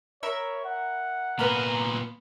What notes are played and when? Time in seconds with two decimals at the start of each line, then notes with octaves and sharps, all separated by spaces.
0.23 A#4 C#5 E5 B5
0.65 F#5
1.39 A#2 B3 B4 F5 A#5